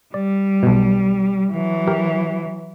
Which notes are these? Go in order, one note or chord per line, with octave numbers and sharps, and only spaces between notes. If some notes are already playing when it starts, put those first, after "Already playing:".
G3 D5
B1 B2
E3 F#3
G4 A#4